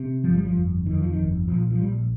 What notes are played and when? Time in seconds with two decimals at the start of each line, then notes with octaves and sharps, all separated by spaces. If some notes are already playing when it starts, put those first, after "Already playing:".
Already playing: C3
0.24 G1 F3
0.34 G3
0.45 F3
0.55 F2
0.86 F2 D#3
0.98 F3
1.10 D#3
1.17 G1
1.47 A#1 F3
1.71 F3
1.79 A#1 G3